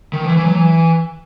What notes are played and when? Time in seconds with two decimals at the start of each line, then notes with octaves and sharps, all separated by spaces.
0.13 D#3
0.25 E3
0.37 E3
0.46 F#3
0.55 E3